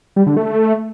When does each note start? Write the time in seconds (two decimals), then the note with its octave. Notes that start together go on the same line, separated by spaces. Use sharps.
0.16 G3
0.26 D3
0.37 A3